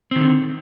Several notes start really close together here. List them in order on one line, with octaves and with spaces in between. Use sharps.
C4 D#3 D3